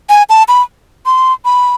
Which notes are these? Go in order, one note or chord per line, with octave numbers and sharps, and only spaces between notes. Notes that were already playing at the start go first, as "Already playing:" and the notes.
G#5
A5
B5
C6
B5